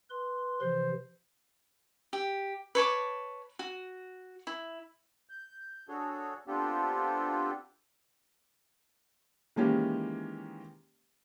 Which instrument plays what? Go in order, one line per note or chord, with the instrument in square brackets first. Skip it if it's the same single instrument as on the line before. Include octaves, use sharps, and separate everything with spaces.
[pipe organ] B4 C6
[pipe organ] C3 E3 F3 [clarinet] C5
[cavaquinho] G4
B4 C#5 A5 D6
F#4
E4
[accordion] G6
D4 F#4 G#4 A4 C#5
B3 C4 D4 F4 G4 A4
[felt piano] D#3 E3 G#3 A#3 C#4 G4